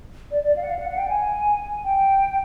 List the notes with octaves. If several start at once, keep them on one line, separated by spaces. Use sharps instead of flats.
D5
D5
F5
F#5
F5
F#5
F#5
G5
G#5
G5